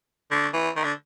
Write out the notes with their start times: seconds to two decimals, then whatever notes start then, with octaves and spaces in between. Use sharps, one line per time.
0.31 D3
0.54 E3
0.76 D#3
0.84 D3